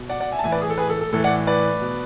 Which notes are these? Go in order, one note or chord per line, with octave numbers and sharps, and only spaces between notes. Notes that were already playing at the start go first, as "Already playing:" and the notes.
Already playing: B2
D5 F#5
D5 F#5
E5 G#5
A5
A2 E3 E5 G#5
B4 D5
G#4
A4
G#4 B4
A4
A4
A2 E3 A4
D5 F#5
B4 D5
B2